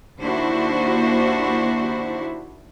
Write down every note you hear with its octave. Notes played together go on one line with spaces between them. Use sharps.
D#2 A#3 D4 E4 F#4 C5